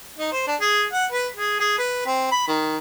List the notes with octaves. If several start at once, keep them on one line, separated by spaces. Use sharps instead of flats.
D#4
C5
D4
G#4
F#5
B4
G#4
G#4
B4
C4
B5
D#3